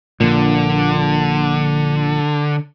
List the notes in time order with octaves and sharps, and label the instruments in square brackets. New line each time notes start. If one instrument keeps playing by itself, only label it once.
[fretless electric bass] A#1 A#2 [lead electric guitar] D3